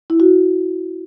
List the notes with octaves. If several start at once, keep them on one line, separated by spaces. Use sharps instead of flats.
E4
F#4